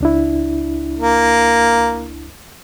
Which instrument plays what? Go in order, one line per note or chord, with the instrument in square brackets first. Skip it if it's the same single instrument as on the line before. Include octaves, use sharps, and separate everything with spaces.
[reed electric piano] C#2 D4 E4
[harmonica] A#3